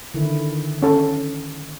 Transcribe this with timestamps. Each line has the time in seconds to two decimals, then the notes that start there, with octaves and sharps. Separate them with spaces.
0.14 D3 D#3 E4
0.82 C#4 A4